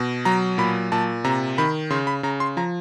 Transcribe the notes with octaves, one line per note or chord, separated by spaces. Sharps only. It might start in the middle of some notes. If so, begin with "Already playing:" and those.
Already playing: B2
F#3 A#5
A#2 B5
A#2 A5
C3 A#5
D#3 B5
C#3 C6
B5
C#3 A#5
C6
F3 A#5